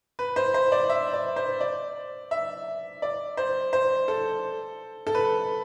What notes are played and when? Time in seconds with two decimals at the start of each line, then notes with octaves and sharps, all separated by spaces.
0.19 B4
0.36 C5
0.54 C5
0.72 D5
0.90 E5
1.13 D5
1.36 C5
1.61 D5
2.31 E5
3.02 D5
3.37 C5
3.73 C5
4.08 A4
5.07 A4
5.15 B4